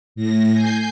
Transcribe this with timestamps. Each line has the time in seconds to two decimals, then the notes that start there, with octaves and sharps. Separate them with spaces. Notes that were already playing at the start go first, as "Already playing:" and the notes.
0.16 A2 A#6
0.50 G#5 G6 C7